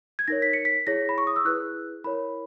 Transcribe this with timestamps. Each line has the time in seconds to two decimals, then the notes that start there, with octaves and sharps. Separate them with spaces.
0.19 G#6
0.28 D#4 A#4 C#5 A#6
0.42 B6
0.53 C#7
0.65 B6
0.87 E4 G#4 C#5 A#6
1.09 B5
1.18 C#6
1.27 D#6
1.36 E6
1.45 E4 G#4 B4 F#6
2.04 E4 A#4 C#5 B5